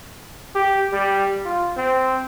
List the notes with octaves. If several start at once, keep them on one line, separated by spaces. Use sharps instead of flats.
G4
G3
F4
C4